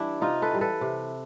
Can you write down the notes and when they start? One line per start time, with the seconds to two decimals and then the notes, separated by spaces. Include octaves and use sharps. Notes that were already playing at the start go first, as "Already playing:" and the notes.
Already playing: E3 G3 D4 E4
0.22 C3 D#4 F4
0.42 A4 B4
0.51 E3 G3
0.61 A4 B4
0.81 C3